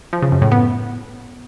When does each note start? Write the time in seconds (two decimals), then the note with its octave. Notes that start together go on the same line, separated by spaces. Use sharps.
0.13 F3
0.22 C#3
0.32 F#2
0.42 A2
0.52 B3